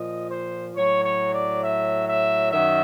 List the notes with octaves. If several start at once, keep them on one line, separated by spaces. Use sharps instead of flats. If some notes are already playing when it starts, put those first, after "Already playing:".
Already playing: A#2 F3 D#5
C5
A2 F#3 C#5
C#5
D5
E5
E5
F#2 D#3 F#3 E5